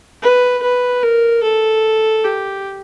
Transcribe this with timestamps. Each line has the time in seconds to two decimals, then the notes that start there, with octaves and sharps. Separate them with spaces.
0.22 B4
0.63 B4
1.03 A#4
1.43 A4
2.24 G4